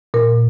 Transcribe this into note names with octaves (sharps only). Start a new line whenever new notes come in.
A#2 A#4